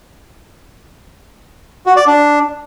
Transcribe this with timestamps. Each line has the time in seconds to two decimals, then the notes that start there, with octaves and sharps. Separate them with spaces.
1.86 F#4
1.96 D5
2.07 D4